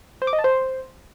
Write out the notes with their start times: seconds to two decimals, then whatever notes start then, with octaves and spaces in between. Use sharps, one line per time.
0.22 C5
0.27 D6
0.33 D#5
0.39 A5
0.44 C5